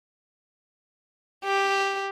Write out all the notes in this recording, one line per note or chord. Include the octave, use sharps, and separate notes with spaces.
G4